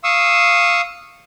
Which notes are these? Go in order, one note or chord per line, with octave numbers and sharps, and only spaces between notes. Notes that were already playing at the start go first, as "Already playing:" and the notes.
F5 C#6 D#6 E6